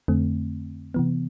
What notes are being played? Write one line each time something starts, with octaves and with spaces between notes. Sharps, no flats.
F2 D3 A3 C4
C3 E3 B3